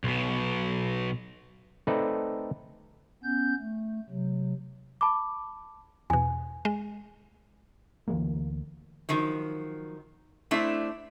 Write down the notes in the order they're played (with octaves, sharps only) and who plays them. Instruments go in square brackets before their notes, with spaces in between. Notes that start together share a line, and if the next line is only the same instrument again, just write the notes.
[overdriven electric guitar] B1 B2
[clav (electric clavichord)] A3 C4 D#4 A4 B4 D5
[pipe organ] B3 C#4 G6
A3
C3 F#3
[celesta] A5 B5 D6
[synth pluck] E2 B2 [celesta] G#5
[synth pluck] G#3
[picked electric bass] D2 E3 G#3 A#3
[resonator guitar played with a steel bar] D#3 F3 F#3
A3 C4 D4 E4